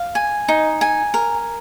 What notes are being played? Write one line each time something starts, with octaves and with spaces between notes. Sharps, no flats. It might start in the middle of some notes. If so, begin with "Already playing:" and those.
Already playing: F5
G#5
D#4
G#5
A#4